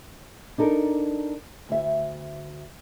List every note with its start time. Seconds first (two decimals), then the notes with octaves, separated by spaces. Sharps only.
0.58 D4 D#4 A4 A#4
1.69 D2 E5